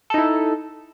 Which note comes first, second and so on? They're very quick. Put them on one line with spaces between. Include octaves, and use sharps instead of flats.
A4 D#4 E4